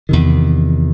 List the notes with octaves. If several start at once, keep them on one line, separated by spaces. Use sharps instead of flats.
E2 C3 D#3